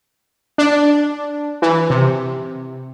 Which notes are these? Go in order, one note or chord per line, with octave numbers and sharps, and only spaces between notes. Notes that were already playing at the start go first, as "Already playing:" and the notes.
D4
E3
C3